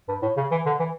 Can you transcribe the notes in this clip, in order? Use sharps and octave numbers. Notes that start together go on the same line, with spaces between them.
G2
A2
C#3
E3
D3
E3